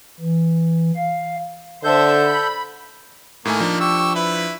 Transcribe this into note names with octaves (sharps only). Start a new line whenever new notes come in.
E3
F5
D3 A4 C5 E5 G6
B5
A2 D#3 A3 A#3 G#5
F3 D4
G4 C#6 E6
E4 B4